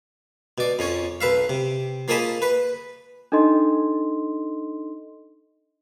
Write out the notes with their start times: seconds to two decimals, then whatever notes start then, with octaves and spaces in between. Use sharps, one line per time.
0.58 B2 D5
0.79 F2 C#4 C#5
1.21 B1 B4 E5 F5
1.49 C3
2.08 F3 A#3 G#4 D#5 A5 B5
2.42 B4 B5
3.32 D4 D#4 A4 D#5 C6